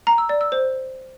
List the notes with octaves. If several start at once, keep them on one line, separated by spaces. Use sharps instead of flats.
A#5
E6
D5
E6
C5